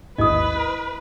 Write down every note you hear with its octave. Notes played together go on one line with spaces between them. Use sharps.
A1 D#2 G#2 E4 B4 D#5 D#6